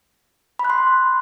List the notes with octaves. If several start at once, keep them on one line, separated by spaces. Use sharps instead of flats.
B5
F#6
C6